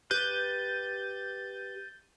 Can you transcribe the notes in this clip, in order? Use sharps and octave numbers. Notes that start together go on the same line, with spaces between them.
G4 B4 F#6 G6 A6 D#7